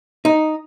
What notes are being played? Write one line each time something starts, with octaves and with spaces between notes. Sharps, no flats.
D#4